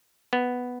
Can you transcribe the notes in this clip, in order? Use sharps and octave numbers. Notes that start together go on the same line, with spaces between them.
B3